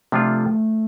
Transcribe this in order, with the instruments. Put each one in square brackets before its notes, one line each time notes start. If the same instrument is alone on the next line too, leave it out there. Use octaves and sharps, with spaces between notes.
[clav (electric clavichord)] C3 F3 D4 F4 [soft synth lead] A3